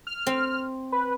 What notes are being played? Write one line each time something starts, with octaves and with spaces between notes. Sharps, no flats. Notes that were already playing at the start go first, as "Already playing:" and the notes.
F6
C4
B4